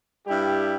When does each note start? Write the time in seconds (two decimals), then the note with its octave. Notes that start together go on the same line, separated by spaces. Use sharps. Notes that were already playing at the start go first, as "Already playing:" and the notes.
0.27 G2 G3 E4 G4